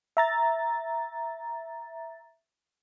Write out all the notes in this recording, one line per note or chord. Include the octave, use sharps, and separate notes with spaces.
E5 A#5 A6